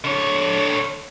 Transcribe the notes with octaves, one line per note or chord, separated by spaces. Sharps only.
D3 C#5